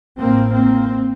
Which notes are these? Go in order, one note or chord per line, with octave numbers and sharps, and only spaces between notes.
A1 A2 A#3 C4
A#3 C4